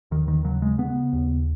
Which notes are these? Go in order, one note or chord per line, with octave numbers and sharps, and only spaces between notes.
D#2 D#3
D#3
C#3 F#3
G#3
C#3 B3
D#2